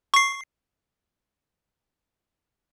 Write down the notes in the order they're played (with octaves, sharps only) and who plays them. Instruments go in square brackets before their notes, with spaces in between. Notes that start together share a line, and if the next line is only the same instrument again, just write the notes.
[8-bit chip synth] C#6 C7